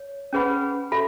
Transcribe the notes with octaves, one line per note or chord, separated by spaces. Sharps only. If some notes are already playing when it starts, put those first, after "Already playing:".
Already playing: C#5
C#4 G#4 B4 F#5 B5
F#4 A4 E5 B5